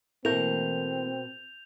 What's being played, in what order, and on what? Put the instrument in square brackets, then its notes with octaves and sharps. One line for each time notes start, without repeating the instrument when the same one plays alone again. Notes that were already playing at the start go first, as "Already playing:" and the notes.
[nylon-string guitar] B2 A#4 [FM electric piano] E3 A3 A#3 [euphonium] C4 [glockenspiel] G6 F7